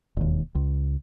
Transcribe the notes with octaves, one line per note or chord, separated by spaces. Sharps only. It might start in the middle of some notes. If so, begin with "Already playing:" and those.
E1 D#2
C#2